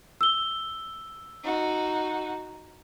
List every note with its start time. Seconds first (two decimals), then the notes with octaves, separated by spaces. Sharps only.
0.21 E6 G7
1.44 D#4 F#4